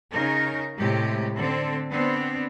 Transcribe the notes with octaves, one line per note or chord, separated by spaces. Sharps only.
C#3 D#4 A#4
A2 C3 G#3 G4
D3 C4 A4
B3 C4 D4